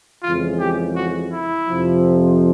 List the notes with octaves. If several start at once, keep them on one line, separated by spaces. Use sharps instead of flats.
F2 C#3 E3 G#3 F4
G4
F#4
E4
F2 C3 F3